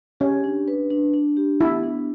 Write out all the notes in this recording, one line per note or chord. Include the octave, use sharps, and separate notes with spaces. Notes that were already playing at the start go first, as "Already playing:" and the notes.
C#4 G4
D4
B4
D4
D4
G4
B3 E4
D4